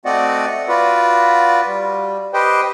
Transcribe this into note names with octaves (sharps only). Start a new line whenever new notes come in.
A3 C4 F#4 D5 D#5 F#5
F4 F#4 B4 D5
G3
G4 B4 C5 D#5 G5